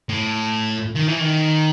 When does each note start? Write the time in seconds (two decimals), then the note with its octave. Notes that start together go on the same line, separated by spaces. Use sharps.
0.09 A2
0.95 D#3
1.08 E3
1.20 D#3